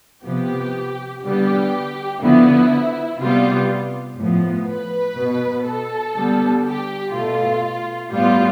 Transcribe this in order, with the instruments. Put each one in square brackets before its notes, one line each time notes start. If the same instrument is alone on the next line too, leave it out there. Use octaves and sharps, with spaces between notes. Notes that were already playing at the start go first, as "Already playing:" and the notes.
[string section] C3 F3 B3 G4
D3 G3 B3 G4
D3 F3 B3 E4
C3 G3 B3 F4
A2 F3 B3
B4
B2 B3
A4
D3 G3 B3
G4
B2 A3 F4
A2 G3 B3 F4